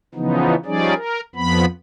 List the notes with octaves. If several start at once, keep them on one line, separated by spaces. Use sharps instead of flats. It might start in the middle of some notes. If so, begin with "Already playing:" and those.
C#3 E3 F3 B3 D#4
F3 G3 C#4 D#4 G#4 D5
A#4
F2 F3 B3 B5